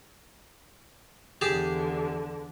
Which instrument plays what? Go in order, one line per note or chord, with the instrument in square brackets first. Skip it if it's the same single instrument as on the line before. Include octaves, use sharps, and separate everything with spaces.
[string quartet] E2 D3 [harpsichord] G4 G#4 A5